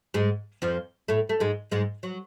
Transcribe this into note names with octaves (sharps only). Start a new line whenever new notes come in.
G#2 G#3
F2 F3
A2 A3
A3
G#2 G#3
G#2 G#3
F#3